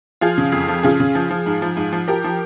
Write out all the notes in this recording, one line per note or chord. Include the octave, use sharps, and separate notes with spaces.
F3 F4 G#4
C#3
F2
F3
C#3 F4 G#4
C#3
F3
F3
G#2
F3
G#2
F3
F3 G4 A#4
F3